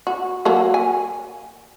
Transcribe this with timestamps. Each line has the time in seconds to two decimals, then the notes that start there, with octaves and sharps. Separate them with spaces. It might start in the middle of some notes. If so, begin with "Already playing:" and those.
0.07 F#4
0.45 F#3 A#3 F#4
0.74 G#5